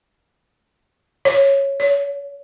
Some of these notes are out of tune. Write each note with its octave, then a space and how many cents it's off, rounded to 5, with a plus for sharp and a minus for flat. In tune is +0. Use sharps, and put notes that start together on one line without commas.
C#5 -10
C#5 +30